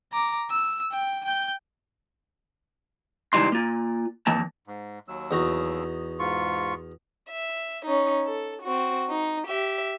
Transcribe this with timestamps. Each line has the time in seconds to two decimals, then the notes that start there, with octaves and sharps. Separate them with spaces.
0.13 A#5 D6
0.50 E6
0.92 G5
1.25 G5 G6
3.33 C#2 E3 G3 D#4 C6
3.52 A#3 F4
4.27 F2 E3 A#3 A5
4.67 G#2
5.08 D#2 F#3 E6
5.31 E2 D#4 F#4
6.19 G#2 F4 C#6
7.30 E5
7.86 C#4 D#4
8.26 A4
8.63 C4 F#4
9.09 D#4
9.48 G4 E5